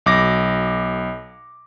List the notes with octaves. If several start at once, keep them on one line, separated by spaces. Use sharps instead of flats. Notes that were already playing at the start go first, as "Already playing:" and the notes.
B1 D6 A#6